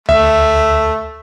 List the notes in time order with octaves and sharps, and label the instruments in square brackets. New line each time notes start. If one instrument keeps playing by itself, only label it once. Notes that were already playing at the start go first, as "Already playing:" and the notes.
[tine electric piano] D2 [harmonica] A3 [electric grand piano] E5